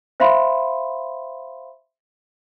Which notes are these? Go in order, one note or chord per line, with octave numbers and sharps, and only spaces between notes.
C5 E5 F5 B5 C6